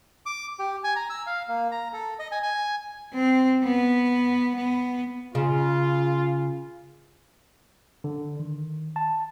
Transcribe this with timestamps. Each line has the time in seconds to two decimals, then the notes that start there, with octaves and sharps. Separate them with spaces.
0.26 D6
0.59 G4
0.84 G#5
0.96 A#5
1.10 E6
1.27 F5
1.48 A#3
1.72 A#5
1.93 A4
2.19 D#5
2.32 G#5
2.43 G#5
3.14 C4
3.64 B3
4.56 B3
5.35 C#3 F4
8.04 D3
8.40 D#3
8.96 A5